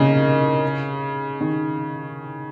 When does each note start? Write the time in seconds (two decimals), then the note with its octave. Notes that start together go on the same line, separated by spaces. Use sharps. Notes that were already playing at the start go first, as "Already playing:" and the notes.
Already playing: C#3 A#3 D#4
1.41 D#3